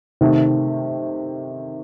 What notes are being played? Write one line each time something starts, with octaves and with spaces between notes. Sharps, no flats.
C3 D#3 A3